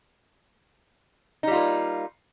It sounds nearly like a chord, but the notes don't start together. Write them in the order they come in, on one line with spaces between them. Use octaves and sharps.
D#4 G3 F4 A#3